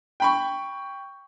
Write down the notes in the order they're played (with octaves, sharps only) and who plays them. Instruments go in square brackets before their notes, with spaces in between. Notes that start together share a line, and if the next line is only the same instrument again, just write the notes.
[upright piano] G5 B5 C#6